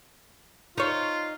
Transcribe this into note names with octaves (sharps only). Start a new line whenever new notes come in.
D#4 F4 C#5